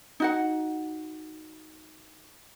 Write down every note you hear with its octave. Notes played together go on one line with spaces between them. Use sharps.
D#4 F#4 F#5